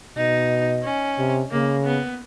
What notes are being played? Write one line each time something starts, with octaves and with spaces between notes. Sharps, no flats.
B2 D#4
C#4
C3
C#3 A#3
B3